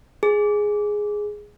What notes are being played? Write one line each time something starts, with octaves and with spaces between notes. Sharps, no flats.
G#4